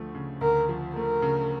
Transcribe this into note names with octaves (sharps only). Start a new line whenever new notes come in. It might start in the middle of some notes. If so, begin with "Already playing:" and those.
Already playing: D2 F3 A3
C#3
D2 A#4
F3
A3 A#4
C#3